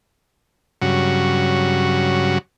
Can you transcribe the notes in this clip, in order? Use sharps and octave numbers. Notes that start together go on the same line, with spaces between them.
G2 C#3 F#3 F#4